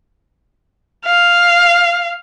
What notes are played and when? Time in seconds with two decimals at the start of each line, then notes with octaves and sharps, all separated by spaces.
1.06 F5